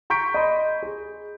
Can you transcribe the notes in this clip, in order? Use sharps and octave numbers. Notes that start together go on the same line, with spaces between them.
A#5 C#6 G6 B6 D7
D#5 B5 C6
G#4